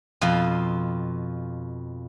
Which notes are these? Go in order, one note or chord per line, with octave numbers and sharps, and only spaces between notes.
F2 B2 F4